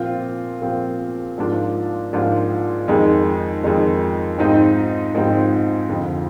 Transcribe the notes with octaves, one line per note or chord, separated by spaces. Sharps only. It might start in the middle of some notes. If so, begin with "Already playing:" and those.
Already playing: A#2 F3 C4 F4
A#2 F3 C4 F4
G#2 F3 A#3 D4 F4
G#2 F3 A#3 D4 F4
F2 D#3 G#3 D#4
F2 D#3 G#3 D#4
G#2 F3 C4 D#4
G#2 F3 C4 D#4
F2 D3 F3